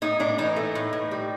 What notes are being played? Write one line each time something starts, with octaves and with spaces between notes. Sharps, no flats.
A2 D#4
A2 D4
E3 D#4
A3
A2
A2
G3